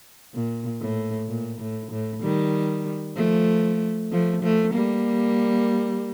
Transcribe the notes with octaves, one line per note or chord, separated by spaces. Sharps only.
A#2
A2
A#2
A2
A2
D#3 G3
F3 A3
F3 A3
F3 A3
G3 A#3